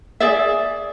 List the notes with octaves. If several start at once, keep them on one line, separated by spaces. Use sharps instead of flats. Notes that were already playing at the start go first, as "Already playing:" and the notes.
G#4 D5 E5